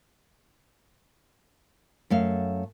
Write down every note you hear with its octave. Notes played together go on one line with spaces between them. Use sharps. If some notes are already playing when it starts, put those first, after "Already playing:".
F#2 A3 F5